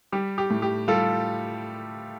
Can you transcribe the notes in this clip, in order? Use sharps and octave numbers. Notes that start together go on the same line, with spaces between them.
G3 G4
G4
A2
G4
G3 F4 A4